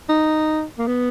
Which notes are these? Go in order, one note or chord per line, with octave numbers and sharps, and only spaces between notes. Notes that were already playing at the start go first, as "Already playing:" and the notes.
D#4
A#3
B3